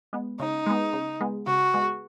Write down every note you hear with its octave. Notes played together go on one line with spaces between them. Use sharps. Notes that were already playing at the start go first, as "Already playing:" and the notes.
G#3 B3
C#3 D#4
G#3 B3
C#3
G#3 B3
C#3 F#4
G#3 B3